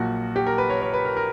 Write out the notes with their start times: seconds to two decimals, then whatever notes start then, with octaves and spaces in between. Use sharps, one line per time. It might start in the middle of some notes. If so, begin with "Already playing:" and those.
Already playing: A#1 A#2 F#3 F#4
0.36 G4
0.47 A#4
0.58 B4
0.70 C#5
0.82 C#5
0.94 B4
1.05 A#4
1.17 A#4